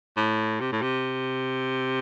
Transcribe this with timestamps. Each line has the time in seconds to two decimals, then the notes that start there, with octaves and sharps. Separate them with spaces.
0.17 A2
0.61 C3
0.72 A2
0.82 C3